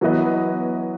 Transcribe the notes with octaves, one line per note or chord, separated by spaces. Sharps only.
E3 F#3 B3 E4 B4 D#5